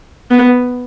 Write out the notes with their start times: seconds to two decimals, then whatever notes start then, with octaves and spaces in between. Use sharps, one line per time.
0.31 B3